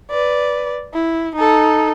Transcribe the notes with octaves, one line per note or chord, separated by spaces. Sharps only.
B4 D5
E4
D#4 A4